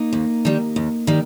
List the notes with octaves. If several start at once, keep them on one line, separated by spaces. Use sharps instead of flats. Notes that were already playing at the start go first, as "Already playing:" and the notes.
Already playing: A#3 D#4
D#2
D#3 G3
D#2
D#3 G3